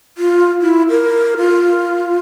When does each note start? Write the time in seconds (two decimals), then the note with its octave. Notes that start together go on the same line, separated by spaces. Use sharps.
0.18 F4
0.62 E4
0.89 A#4
1.37 F4